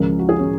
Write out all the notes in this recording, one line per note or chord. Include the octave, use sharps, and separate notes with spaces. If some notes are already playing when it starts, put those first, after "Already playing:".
Already playing: C#2 C#3 F3 G#3 A#4
F#4
G#4
C#4